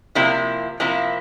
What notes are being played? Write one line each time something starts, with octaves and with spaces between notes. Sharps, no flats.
C3 F3 A#3 E4
C3 F3 A#3 E4